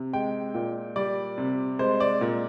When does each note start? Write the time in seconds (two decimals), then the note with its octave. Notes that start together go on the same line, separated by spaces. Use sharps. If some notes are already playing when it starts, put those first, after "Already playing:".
Already playing: C3
0.13 G#3 G5
0.54 A#2
0.96 G3 D5
1.38 C3
1.79 G#3 C5
2.00 D5
2.21 A#2